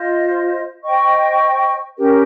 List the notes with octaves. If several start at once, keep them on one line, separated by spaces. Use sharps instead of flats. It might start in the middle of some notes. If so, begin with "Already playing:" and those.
Already playing: F4 C5 D#5
C5 D#5 G5 C#6
C#4 G4 A#4